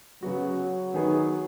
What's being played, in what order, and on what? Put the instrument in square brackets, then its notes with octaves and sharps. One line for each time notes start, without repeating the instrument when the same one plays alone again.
[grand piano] C#3 B3 F#4 [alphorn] F#3
[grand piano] D#3 B3 D#4 G#4